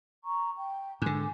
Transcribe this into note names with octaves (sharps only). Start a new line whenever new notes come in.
A#5 C#6
G5
G#2 D3 G#5 D6